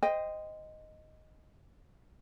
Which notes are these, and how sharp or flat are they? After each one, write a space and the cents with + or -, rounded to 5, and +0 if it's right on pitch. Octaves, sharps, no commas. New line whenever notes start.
C5 -15 D#5 +0 G5 +20